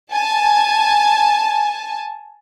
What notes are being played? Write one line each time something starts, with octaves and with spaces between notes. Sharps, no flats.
G#5 A5